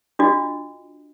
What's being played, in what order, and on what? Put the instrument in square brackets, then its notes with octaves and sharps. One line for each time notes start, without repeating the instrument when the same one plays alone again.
[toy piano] D4 F4 F#4 D#5